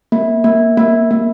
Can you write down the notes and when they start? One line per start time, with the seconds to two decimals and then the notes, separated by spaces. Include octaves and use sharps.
0.12 A#3
0.44 A#3
0.77 A#3
1.11 A#3